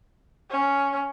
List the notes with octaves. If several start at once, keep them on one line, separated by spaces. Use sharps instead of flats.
C#4